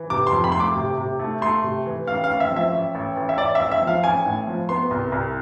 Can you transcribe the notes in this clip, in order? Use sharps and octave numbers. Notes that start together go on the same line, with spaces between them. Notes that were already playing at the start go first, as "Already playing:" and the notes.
Already playing: E3
C3 D6
C6
F2
B5
A3 C6
D6
C3
C3
A3
A3 C6
C3
E3
A1 F5
A1 F5
E5
F3
E5
A1
A1
A1
E5
A1 D5
E5
A1
E5
F3
F5
A1 G#5
A2
F3
B3 C6
C2
C2